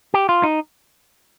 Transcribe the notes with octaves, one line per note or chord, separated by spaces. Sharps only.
G4
F4
D#4